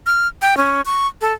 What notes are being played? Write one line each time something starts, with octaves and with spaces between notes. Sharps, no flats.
F6
G5
C#4
C#6
A4